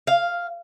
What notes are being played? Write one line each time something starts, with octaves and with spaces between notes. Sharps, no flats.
F5